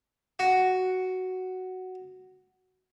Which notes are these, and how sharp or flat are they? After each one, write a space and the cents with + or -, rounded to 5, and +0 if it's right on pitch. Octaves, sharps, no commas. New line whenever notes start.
F#4 +5